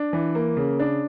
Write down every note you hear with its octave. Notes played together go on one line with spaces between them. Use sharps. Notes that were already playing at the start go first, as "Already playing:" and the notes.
Already playing: D4
E3
A#3
C#3
D4